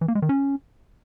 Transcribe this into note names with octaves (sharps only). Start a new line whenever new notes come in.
E3
A#3
G#3
D#3
C#4